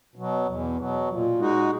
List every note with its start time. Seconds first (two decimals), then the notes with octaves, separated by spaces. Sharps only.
0.16 B2 F#3
0.46 E2
0.78 B2 F#3
1.09 A#2
1.39 G#3 D#4 F#4